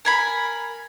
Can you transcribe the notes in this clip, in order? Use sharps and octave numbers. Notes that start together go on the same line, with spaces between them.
A#4 G#5 B5